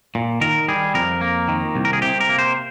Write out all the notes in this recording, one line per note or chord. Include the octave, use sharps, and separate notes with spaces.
A#2
D#3 A#4
G3 G#4
F2 A#4
A#3
D#3
C2
A#4
G#4
C3 G4
A#4
A#3
C5